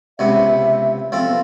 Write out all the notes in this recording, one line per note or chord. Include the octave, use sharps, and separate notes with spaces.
C#2 C3 B3 E5
F3 C4 A4
B3